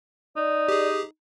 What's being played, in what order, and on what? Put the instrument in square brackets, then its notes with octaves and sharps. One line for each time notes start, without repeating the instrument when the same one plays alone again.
[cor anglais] D#4 [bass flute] D5
[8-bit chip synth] G4 G#4